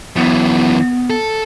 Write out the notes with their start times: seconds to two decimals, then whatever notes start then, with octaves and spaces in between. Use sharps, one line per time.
0.16 F#2 E3 B3
1.10 A4